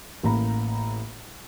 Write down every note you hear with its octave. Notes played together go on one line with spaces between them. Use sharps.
A1 A2 A#3 A#5 B5